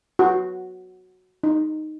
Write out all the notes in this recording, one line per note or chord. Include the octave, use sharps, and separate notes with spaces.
F#4
D#4